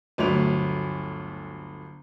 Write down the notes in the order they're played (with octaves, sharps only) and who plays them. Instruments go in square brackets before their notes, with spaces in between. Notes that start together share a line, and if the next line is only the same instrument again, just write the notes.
[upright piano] G1 D2 F#3 B4 F7